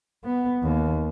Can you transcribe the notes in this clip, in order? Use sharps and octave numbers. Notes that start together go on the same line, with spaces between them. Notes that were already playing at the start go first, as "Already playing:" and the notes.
B3
D#2